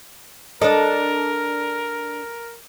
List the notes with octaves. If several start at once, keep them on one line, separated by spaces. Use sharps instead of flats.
D4 A4 A#4 D#5